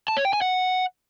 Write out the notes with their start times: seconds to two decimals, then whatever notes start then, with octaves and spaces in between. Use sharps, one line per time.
0.08 A5
0.17 C#5
0.25 G5
0.33 G#5
0.42 F#5